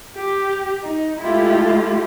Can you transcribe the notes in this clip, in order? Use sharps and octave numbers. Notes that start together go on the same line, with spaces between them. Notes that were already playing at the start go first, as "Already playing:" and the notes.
G4
D#4
G#3 A3 E4 F4 G4